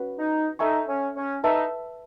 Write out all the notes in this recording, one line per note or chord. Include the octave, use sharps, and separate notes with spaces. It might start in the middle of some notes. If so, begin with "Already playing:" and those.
Already playing: C#4 F#4 B4 F#5
D#4
D#4 A4 E5 G#5 C#6
C#4
C#4
D#4 B4 E5 A5